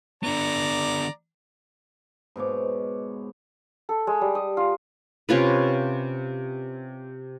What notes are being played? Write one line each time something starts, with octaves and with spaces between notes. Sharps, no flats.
D3 B3 D5 A#5
G#2 B2 C#5 D6
A4
G#3
G3
D#5
F4
C3 C#4 F4 B4